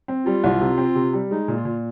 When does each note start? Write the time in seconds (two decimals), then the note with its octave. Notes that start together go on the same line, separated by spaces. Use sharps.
0.08 C4
0.25 G3 F4
0.44 C2
0.60 C3
0.78 C4
0.95 C3
1.13 G3
1.31 G#3 D#4
1.48 A#2
1.57 F4
1.65 A#2